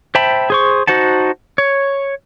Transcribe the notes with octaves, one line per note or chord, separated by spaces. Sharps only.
C5 E5 G5 A5 B5
G#4 C5 C#6
D#4 F#4 C5 F#5 A5
C#5